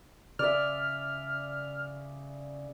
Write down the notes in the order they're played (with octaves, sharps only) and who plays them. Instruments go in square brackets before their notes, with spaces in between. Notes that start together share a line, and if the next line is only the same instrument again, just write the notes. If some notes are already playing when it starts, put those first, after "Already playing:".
[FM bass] C#3 [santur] D5 E5 [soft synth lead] F6